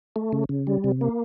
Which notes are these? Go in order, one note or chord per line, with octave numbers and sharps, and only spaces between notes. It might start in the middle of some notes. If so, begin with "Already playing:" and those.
A3
C#3
C#3
G3
C3
A#3